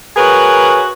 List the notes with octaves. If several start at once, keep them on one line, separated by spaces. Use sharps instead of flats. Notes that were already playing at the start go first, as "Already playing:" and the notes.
F#4 G#4 A#4 B4 C#5